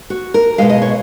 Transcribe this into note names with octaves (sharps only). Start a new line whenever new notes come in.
F#4
A#4
B2 G#3 F5
D#5
C#5